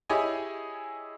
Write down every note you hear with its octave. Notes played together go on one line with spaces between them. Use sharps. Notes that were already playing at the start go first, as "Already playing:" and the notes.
E4 G4 G#4 C#5 D#5 G#5